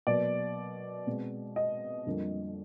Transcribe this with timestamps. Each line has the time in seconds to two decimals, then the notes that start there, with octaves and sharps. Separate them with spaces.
0.07 B2 F#3 A#3 D5
1.07 B2 G#3 C4
1.56 D#5
2.06 F2 D3 G3 A#3